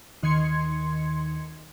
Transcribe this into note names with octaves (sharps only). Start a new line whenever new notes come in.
D#2 D#3 C6 G#6 C#7